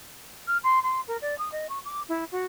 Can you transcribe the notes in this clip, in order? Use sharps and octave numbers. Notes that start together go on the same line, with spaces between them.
F6
C6
C6
A#4
D5
D#6
D#5
C#6
D6
E4
F#4